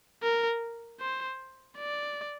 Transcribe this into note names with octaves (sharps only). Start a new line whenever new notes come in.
A#4
C5
D5